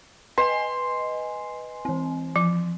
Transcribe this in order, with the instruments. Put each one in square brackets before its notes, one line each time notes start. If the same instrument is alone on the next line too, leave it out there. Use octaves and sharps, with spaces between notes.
[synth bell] B4 D#5 G#5 [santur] C6
[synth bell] E3 C4
[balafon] F3